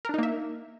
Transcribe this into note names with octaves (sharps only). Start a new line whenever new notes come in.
A#3 D4 D#4 A#4 E5